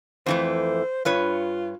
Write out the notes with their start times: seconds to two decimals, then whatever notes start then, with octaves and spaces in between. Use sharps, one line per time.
0.26 F2 E3 A3 C5
1.05 G2 F4 B4 C#5